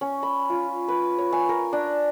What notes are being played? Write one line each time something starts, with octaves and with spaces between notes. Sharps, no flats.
C#4
B5
F4
B4
C#5
G#5
A#4
D4